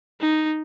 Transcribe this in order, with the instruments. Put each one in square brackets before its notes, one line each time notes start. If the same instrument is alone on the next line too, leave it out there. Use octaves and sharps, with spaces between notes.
[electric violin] D#4